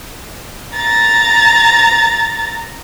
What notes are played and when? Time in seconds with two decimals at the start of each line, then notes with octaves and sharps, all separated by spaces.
0.76 A#5 A6